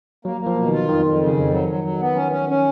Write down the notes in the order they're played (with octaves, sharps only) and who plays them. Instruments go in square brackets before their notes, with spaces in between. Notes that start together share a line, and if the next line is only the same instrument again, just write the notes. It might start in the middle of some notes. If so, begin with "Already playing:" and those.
[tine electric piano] F#3 [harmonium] A#3
[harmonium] A#3
[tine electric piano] F3
[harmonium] B2
[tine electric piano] D#3
[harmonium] F4
[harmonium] F2 [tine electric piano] D#3
[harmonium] F2
C#3
F2
F#3
F#3
F#3
B3
C#4
C#4
C#4